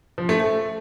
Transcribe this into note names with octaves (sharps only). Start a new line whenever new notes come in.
F3
A3
A3